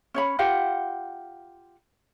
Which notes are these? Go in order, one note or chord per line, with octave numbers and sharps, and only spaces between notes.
C#4 C#5 B5
F4 G4 F5 F#5